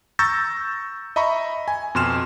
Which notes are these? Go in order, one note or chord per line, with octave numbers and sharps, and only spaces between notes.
A#5 C#6 E6 G6 A6 A#6
D#5 E5 A#5 B5 C#6
G#5
F2 B2 C6 F6 E7